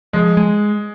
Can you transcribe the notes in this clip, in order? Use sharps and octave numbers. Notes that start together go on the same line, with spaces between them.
F3 G#3
G#3